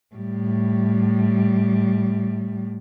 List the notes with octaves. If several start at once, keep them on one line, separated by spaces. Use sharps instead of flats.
A2 G3